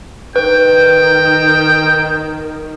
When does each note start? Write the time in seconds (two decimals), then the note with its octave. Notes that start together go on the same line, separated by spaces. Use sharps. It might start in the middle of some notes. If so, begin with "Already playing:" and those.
0.36 D#3 B4 G5